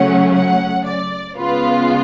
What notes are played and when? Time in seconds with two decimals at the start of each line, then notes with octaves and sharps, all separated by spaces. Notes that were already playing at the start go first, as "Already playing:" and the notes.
Already playing: C#3 F#3 A3 C#4 F#5
0.33 F#5
0.86 D5
1.37 C#3 G#3 B3 F4 B4